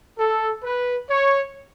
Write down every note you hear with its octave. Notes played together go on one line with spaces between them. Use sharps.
A4
B4
C#5